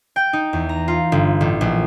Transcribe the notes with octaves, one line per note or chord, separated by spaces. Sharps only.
G5
D#4
E2
A#5
F4
G1
A1
A#1